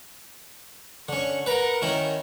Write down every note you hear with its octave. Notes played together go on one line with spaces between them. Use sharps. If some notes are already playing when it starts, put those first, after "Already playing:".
D3 C#4 C#6
A#4 B4 F#5 A#5
D#3 C#4 E4